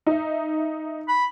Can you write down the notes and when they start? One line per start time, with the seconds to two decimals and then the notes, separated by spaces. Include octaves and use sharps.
0.07 D#4 E5
1.08 B5